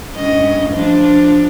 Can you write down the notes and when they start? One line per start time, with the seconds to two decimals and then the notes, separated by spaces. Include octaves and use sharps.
0.14 G2 C#4 D#5
0.70 F3 D4 F4